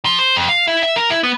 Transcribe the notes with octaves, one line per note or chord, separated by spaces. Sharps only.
F3
C5
F2
F5
E4
E5
A#4
E4
B3